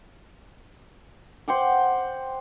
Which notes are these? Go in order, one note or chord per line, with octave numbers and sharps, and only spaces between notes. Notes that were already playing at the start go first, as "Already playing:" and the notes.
C5 F#5 G5 D6